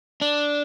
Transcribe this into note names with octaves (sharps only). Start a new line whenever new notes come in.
D4